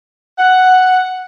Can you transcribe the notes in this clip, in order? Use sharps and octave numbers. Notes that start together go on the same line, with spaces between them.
F#5